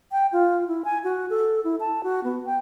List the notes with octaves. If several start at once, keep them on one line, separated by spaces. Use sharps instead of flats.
G5
F4
E4
G#5
F#4
A4
E4
A5
F#4
B3
G5